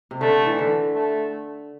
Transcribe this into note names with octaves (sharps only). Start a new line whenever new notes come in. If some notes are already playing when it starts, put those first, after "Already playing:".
C3
D3 A3
E3
D3
A3